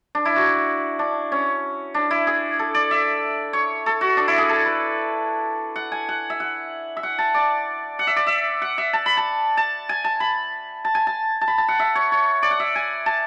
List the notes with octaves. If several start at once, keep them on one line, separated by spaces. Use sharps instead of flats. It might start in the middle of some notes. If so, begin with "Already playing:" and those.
D4
E4
F#4
D4
C#4
D4
E4
G#4
A4
D5
E5
C#5
A4
F#4
D4
E4
G#4
A4
B4
F#5
G#5
F#5
E5
F#5
E5
F#5
A5
D5
F#5
E5
D5
E5
F#5
E5
A5
B5
A5
A5
G#5
A5
B5
A5
G#5
A5
A5
B5
A5
F#5
E5
C#5
C#5
D5
F#5
E5
G#5
A5